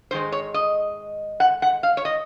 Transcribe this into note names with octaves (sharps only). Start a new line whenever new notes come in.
G#2 D#3 G#3 D#4 C5
C#5
D#5
F#5
F#5
F5
C#5
D#5